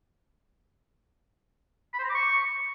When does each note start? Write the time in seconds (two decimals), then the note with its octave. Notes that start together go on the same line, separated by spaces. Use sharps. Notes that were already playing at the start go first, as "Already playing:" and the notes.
1.93 B5
1.99 C5
2.04 A#5
2.09 D6
2.14 C#6